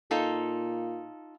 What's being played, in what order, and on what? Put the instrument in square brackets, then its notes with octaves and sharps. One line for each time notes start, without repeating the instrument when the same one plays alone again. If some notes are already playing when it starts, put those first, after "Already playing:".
[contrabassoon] A#2 [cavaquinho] D#4 F4 A4